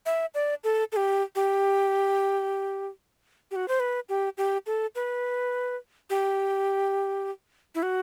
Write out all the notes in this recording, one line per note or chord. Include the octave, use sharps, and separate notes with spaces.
E5
D5
A4
A4
G4
G4
G4
F#4
C5
B4
G4
G4
A4
B4
G4
E4
F#4